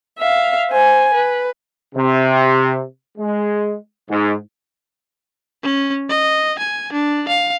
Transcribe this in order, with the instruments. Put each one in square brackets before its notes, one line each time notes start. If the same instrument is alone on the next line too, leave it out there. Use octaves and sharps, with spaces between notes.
[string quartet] E5 F5
C5 G#5
B4
[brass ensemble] C3
G#3
G#2
[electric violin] C#4
D#5
G#5
D4
F5